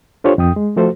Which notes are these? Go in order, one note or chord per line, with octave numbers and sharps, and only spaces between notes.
D4 F4 G4 A4 C5 C#5
F2 G5 D#6
G#3
F3 A3 F#4 A4 C5